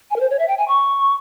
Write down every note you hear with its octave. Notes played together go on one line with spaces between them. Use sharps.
G#5
A#4
C5
C#5
E5
G5
G#5
C#6